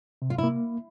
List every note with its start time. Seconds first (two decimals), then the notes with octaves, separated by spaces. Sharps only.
0.22 C3
0.30 F4
0.38 E4
0.43 A#3